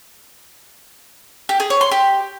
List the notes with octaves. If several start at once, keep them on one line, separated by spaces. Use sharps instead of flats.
G4
G#4
C#5
C6
G4